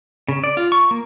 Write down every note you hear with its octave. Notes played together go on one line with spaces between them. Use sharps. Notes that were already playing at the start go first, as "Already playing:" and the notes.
C#3
D5
F4
C#6
A#3